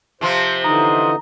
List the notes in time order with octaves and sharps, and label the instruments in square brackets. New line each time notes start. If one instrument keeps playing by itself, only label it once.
[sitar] C3 F3 C4 [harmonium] C5
[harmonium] D3 E3 D#4 [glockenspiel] A#5 [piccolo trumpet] D#6